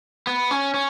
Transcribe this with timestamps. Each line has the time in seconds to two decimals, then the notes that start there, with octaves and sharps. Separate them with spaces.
0.27 B3
0.51 C#4
0.74 C#4